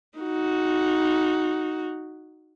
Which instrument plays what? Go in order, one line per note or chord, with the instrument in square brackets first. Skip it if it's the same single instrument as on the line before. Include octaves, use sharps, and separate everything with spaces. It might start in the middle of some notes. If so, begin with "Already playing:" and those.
[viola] D#4 F#4